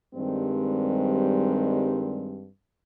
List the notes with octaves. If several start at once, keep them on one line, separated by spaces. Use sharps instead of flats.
G2 D#3 G3 G#3 C4